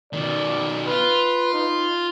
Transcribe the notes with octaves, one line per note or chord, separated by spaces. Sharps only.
B2 D#3 D5
F4 B4
D#4